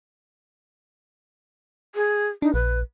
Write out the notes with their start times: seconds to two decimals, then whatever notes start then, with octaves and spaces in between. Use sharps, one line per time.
1.95 G#4
2.42 D4 D#4
2.54 A#1 B4